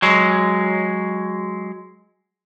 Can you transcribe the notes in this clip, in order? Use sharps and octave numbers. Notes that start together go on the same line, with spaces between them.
F#3 G#3